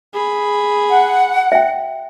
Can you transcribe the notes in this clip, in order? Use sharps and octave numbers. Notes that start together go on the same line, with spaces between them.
G#4 B5
F#5
E5 G5